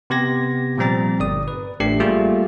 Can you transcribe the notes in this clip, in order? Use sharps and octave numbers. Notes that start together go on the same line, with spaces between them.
C3 B3 G4 G#6 A#6
A#2 F3 G3 C4 A#5 A6
G1 D5 D#6
B4
A1 A3 D4 G4 C7
G3 A3 A#3 F4 G4 G#4